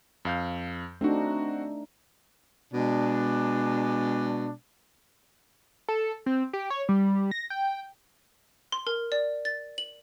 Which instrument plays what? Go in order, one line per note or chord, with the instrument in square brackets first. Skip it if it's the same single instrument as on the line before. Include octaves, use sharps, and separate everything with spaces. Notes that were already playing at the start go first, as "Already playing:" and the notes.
[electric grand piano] F2 F5 G6
[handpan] A3 D4 D#4 [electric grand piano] C4 F#4
[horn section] B2 G#3 D4
[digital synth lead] A4
C4
G4
C#5
G3
A#6
G5
[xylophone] C6
A#4
D5
A6
F#7